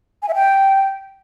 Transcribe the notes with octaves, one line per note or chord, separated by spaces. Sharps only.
G#5
E5
G5